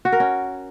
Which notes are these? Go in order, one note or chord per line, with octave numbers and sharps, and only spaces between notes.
F#4
A#4
C#4